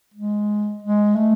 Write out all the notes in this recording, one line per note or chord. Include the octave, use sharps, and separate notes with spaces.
G#3
G#3
A3